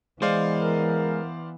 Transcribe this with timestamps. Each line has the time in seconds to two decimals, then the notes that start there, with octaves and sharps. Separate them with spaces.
0.22 E3 G#3 B3 C5 D5 F5
0.59 A#4